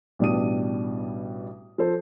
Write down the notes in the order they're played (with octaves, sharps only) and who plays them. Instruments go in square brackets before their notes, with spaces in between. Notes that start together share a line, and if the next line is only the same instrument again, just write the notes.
[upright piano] A1 B2 G3 D4 D#6 D#7
F3 A4 C5